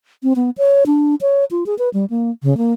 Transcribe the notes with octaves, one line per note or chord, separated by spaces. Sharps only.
C4
B3
C#5
D4
C#5
F4
G#4
B4
G3
A#3
C#3
A#3